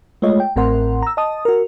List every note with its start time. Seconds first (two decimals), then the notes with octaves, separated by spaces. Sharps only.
0.22 G#3 A3 F4 C#5 D#5
0.40 G5
0.56 A1 A2 C4 A#4 F#5 C6
1.02 A#5 E6
1.17 D#5 A5 D#6
1.45 F#4 A#4